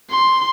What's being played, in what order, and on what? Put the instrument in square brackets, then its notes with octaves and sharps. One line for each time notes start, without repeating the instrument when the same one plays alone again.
[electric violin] C6